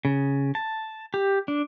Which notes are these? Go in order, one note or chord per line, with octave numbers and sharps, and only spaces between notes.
C#3
A5
G4
D4